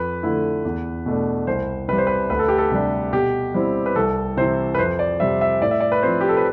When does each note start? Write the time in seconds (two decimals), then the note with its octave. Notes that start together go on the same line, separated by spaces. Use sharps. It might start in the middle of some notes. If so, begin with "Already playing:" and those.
Already playing: F2 B4
0.23 D3 A3 E4
0.65 E2
1.06 B2 A3 D4
1.47 C2 C5
1.88 C3 G3 B4
1.98 C5
2.07 B4
2.30 D2 B4
2.39 A4
2.48 G4
2.58 A4
2.72 C3 G3 D4
3.13 B2 G4
3.54 G3 C4 E4
3.86 B4
3.96 C2 A4
4.37 C3 E3 C5
4.75 B4
4.79 F2 C5
4.99 D5
5.20 C3 G3 C4 E5
5.41 E5
5.61 A2 D5
5.71 E5
5.80 D5
5.92 B4
6.03 F3 C4 C5
6.21 G4
6.29 A4
6.37 B4